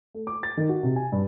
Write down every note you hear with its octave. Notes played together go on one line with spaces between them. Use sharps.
A3
D6
A6
D#3
F#4
C3
G#5
G2